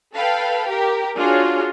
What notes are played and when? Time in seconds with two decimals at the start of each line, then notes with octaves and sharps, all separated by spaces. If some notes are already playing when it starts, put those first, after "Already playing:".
0.14 A4 B4 F5 G5
0.67 G4 A#4
1.17 D4 F4 F#4 G#4 C#5